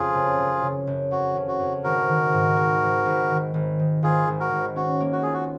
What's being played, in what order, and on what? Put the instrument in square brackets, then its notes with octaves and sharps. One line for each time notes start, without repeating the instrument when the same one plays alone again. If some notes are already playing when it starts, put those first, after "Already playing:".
Already playing: [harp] F2 C#3 [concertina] F4 G#4
[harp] F#1
F#1
C#3
F#1
[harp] F2 [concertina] F#4
[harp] C#3
[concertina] F#4
[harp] F2
[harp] G#1 [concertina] F#4 A#4
[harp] D#3
G#2
G#1
G#1
G#1
D#3
G#1
D#3
[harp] G#1 [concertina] F4 G#4
[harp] G#1
[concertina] F#4 A#4
[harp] G#1
[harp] C#4 [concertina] F#4
[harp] A#3
[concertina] F#4
[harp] F4 [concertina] G#4
[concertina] F#4